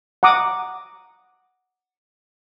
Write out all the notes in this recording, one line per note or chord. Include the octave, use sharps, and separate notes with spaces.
F#5 A#5 D6 D#6